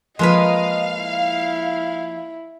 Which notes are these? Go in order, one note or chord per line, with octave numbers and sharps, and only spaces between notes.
F3 G#3 A#3 A#4 B4 D#5 F5
E4